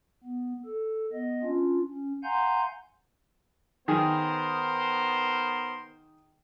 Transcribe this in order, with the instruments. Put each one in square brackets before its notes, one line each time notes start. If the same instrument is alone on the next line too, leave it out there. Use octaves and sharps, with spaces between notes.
[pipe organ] B3
A4
B3 D#5
C#4 D4 F4
C#4
F5 F#5 G#5 A#5 C6 G6
[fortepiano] D#3 G#4 [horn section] B3 A#4 C5